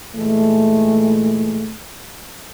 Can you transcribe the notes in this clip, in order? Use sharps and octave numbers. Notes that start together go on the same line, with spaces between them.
A#2 E3 G#3 A3